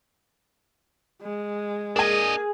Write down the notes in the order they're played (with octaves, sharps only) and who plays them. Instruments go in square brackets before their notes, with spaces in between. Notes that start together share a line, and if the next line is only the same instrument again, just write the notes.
[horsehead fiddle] G#3
[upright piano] A#3 G#5 [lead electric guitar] D4 D#5 [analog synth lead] G#4